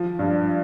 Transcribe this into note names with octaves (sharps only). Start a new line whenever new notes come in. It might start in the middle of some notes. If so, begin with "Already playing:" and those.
Already playing: F3
G2